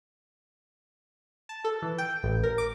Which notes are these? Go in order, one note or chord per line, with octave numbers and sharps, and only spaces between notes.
A5
A4
E3
G5
A1
A#4
D6